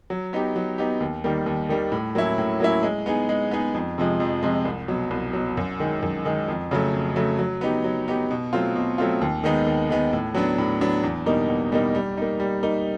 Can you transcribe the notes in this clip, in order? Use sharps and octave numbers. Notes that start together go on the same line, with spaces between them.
F#3
B3 D#4 G4
F#3
B3 D#4 G4
D#2
D#3 G3 A#3
D#2
D#3 G3 A#3
A2
F#3 A#3 C#4 E4
A2
F#3 A#3 C#4 E4
G#3
B3 D#4 G#4
G#3
B3 D#4 G#4
F2
C3 F3 G#3
F2
C3 F3 G#3
C2
B2 F#3
C2
B2 F#3
F#2
D#3 G#3
F#2
D#3 G#3
F2
C#3 F#3 A3
F2
C#3 F#3 A3
F#3
B3 D#4 G4
F#3
B3 D#4 G4
B2
F#3 A3 C4 F4
B2
F#3 A3 C4 F4
D#2
D#3 G#3 B3 D#4
D#2
D#3 G#3 B3 D#4
A2
F#3 B3 D4
A2
F#3 B3 D4
E2
B2 G3 A#3 D#4
E2
B2 G3 A#3 D#4
G3
A#3 D#4
G3
A#3 D#4